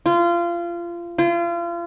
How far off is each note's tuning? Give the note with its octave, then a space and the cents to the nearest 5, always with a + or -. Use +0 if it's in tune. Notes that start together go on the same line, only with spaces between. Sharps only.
F4 -25
F4 -35